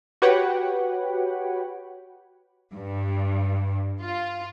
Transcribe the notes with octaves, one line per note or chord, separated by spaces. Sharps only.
F#4 G4 B4 C#5 F#5 G5
G2
F4